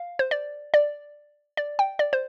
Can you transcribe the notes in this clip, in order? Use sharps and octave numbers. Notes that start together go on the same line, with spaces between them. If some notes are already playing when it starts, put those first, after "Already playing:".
Already playing: F5
C5
D5
D5
D5
G5
D5
C5